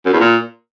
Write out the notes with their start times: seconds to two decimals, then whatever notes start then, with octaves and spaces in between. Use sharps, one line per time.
0.06 F#2
0.13 E2
0.20 A#2